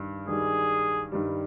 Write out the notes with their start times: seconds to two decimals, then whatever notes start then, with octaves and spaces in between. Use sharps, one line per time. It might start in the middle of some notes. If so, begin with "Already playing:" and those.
Already playing: G2 D#3 G3
0.28 G2 D#3 G3 G#4
1.12 G2 D#3 G3